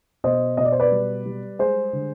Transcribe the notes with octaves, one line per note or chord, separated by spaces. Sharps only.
B2 C5 D#5
B2 D#5
D5
C5
B4 D5
G3
G3
G#3 G#4 C5
D3